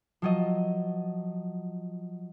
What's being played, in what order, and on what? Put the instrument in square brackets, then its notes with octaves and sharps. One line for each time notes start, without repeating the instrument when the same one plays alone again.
[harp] F3 F#3 D#5